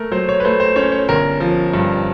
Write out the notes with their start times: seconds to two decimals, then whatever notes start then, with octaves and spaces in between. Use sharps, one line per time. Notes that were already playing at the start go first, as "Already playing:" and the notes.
Already playing: A3 A#4
0.12 F#3 C5
0.29 C#5
0.40 B4
0.44 A3 C5
0.60 C5
0.76 C#4 C#5
0.92 C#5
1.09 G1 A#4
1.40 F3
1.74 G2